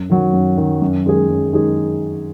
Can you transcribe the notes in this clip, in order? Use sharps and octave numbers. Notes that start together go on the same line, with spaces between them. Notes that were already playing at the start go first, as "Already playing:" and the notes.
Already playing: F#2
D#3 F#3
F#2
D#3 F#3
F#2
D#3 G#3 D#4 G#4
F#2
D#3 G#3 D#4 G#4